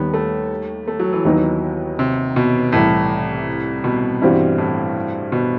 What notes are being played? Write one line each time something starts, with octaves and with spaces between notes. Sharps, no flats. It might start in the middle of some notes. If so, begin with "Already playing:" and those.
Already playing: D#2 D#3 G3 B3
A3
A3
F#3
E3
D#2 D#3 F#3 B3 D#4
C3
B2
C2 A2 C3 E3
B2
G2 E3 G3 C4 F#4
A2
B2